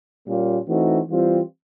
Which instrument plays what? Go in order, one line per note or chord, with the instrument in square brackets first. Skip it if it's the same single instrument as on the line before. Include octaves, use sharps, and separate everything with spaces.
[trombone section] A#2 G3 A#3 C#4 F4
E3 A3 C4 D#4 F#4
E3 G3 C4 F4